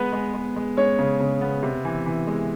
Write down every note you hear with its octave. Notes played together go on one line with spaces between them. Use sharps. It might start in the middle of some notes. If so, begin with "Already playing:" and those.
Already playing: G#3 B3 B4
G#3
G#3
G#3
G#3 C#4 C#5
C#3
C#3
B3
C3
E3
E3
G#3